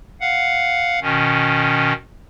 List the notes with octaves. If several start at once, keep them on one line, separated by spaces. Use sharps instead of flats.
F5 F#5
B2 D#3 C#4